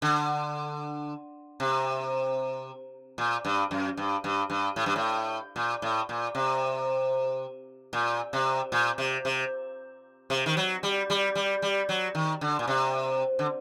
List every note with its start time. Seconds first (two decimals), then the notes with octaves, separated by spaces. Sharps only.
0.02 D3
1.60 C3
3.18 A#2
3.45 G2
3.71 F#2
3.97 G2
4.24 G2
4.50 G2
4.76 A2
4.86 G2
4.96 A2
5.56 A#2
5.82 A2
6.09 A#2
6.35 C3
7.93 A#2
8.33 C3
8.72 A#2
8.98 C3
9.25 C3
10.30 C3
10.46 D#3
10.57 F#3
10.83 G3
11.10 G3
11.35 G3
11.62 G3
11.89 F#3
12.15 D#3
12.41 D3
12.59 A#2
12.67 C3
13.39 D3